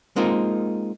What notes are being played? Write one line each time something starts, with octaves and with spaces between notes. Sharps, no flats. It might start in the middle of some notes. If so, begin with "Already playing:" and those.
G#3 A#3 C4 D#4 F4 A#4